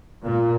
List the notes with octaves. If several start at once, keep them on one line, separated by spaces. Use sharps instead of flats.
A#2